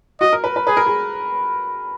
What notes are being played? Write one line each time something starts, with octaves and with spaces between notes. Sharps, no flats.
F#4 D#5
A#4
B4
B4
G#4 B4
A#4
G#4